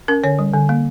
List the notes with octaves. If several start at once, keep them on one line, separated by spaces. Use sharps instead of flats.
C#4 A#4
D3 C#5
G3
D3
A#3